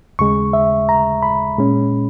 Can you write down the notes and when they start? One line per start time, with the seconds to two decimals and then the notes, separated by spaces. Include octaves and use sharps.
0.19 D#2 C#3 G#3 C#6
0.53 E5
0.89 A#5
1.23 B5
1.58 A#2 G#3 C#4